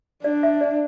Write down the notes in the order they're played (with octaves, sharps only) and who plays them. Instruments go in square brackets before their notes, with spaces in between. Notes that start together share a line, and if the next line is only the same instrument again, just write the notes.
[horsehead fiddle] D4 [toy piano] D5
[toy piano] E5
D5